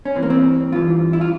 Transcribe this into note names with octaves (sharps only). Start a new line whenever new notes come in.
C#4
G2 E3 C4
A#3
C4
G2 E3 F4
E4
F4